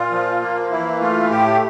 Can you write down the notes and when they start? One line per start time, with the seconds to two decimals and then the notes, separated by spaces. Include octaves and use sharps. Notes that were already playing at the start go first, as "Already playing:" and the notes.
Already playing: A#2 F4
0.12 F3
0.42 A#3
0.71 E3 E4
1.00 A3 F4
1.31 A2 G4